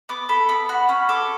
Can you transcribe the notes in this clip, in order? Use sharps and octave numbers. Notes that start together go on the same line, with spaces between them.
B3 D6
A4 B5
B3 B5
F#4 B5
C#4 B5
A4 D6